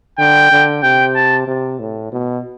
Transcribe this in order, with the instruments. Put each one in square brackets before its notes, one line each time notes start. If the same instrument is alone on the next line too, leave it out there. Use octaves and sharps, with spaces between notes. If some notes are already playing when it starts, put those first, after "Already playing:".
[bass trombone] D3 [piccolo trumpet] G5
[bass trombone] D3
[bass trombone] C3 [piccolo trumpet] G5
[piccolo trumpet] A5
[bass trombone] C3
A2
B2